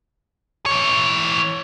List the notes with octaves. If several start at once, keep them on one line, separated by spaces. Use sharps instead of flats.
E3 C#5